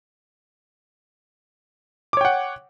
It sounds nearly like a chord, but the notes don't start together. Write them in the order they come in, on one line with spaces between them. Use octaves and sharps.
D6 C#5 G5 F#5